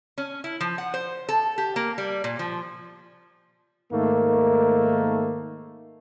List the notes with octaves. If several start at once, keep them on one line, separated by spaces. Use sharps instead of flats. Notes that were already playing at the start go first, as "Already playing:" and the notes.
C#4
E4
F3
F#5
C5
A4
G4
A#3
G3
A#2
F3
G#2 D#3 A3 A#3